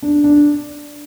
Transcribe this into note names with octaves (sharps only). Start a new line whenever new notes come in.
D4
D4